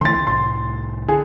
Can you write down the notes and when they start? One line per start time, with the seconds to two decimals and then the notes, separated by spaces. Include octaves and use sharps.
0.01 D3 E3 A3 C6 A6
0.15 C#2
0.27 C2 A2 C6
1.08 D3 G#4